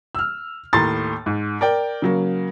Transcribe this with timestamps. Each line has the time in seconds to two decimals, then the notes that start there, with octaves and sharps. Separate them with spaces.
0.15 E6 F6
0.73 D#2 A2 A#5 C6 A6
1.26 G#2
1.61 A#4 D5 G5
2.02 C#3 F#3 A#3